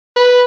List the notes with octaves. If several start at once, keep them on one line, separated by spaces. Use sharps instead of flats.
B4